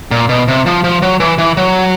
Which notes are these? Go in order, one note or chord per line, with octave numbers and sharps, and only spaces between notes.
A#2
B2
C3
F3
F3
F#3
E3
E3
F#3